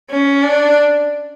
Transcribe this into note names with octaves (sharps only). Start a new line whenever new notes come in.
C#4
D4